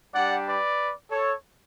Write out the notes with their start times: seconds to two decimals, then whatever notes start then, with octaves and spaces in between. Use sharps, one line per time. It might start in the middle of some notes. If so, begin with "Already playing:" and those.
0.13 G3 D4 G4 D5 F#5
0.46 B4 D5
1.10 A4 C#5